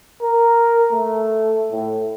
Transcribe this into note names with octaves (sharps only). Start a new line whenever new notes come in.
A#4
A3
A2